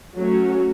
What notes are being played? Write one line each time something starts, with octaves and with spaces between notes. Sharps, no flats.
F#3 A3 C#4 F#4